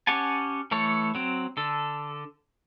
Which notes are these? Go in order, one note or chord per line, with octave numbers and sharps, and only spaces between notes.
C#4 G4 F#5 G#5 A5
E3 A3 A4 C#5
F#3 C4
D3 A4